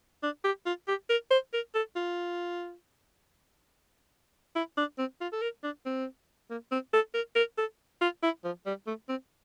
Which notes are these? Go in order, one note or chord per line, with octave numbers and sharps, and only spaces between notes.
D4
G4
F4
G4
A#4
C5
A#4
A4
F4
E4
D4
C4
F4
A4
A#4
D4
C4
A#3
C4
A4
A#4
A#4
A4
F4
E4
F3
G3
A3
C4